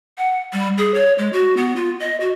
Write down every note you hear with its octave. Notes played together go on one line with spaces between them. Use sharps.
F#5
G3
G#4
C#5
G#3
F#4
B3
F4
D#5
F#4